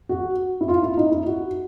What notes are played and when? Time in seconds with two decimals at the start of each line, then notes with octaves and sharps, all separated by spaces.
0.09 F#4
0.61 E4
0.68 F4
0.83 E4
0.97 D#4
1.12 E4
1.27 F#4